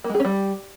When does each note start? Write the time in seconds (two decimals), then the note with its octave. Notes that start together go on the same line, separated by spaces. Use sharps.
0.04 A#3
0.10 G#3
0.15 G#4
0.20 C#4
0.25 G3